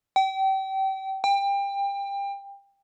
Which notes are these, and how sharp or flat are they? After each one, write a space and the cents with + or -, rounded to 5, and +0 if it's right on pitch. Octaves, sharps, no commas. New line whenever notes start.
G5 -30
G5 +25